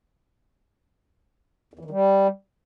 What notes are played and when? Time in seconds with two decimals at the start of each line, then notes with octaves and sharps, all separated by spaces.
1.73 E2
1.79 E3
1.85 D#3
1.91 G3